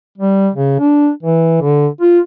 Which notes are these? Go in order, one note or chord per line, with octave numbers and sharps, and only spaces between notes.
G3
C#3
D4
E3
D3
F4